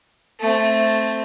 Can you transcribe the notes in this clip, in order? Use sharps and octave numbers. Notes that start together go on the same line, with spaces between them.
A3 C4